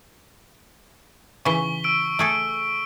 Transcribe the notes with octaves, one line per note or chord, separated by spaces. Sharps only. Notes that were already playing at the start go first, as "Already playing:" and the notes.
C#3 E3 C#6 B6 G7
E6 D7
A3 G#4 A4